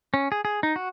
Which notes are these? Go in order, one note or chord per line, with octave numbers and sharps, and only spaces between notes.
C#4
G#4
G#4
D#4
F#4